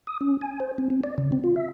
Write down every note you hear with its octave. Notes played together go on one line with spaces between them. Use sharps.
D#6
C#4
G#5
C5
C4
C4
D5
C#3
C4
F4
E5